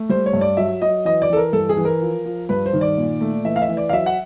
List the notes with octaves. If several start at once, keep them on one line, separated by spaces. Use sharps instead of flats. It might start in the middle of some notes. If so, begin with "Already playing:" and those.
Already playing: A3
G3 C5
C#5
G2
D5
F#3 E5
F#3 D#5
E3 D#5
D5
E3 A4
A#4
G2 A4
G#4
E3
A#4
F3
F3
G2 B4
C5
D#3
D5
A#2
A3
E3 E5
F5
E5
E3
D5
F5
F#3 E5
F#5